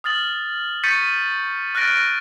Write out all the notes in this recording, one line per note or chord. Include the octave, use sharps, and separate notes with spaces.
D#6 F6 A6 F#7
C#6 G6 A6 B6 C#7 D#7
F6 F#6 A6 A#6 D7